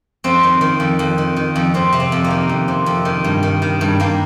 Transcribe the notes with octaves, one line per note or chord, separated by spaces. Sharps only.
F2 C4
D#3
D#3
F2
F2
D#3
D#3
F2
F2 C4
C3
C4
F2
A#3
D#3
F2
C3
F2
D#3
G2
D#3
D#3
G2
G2 A#3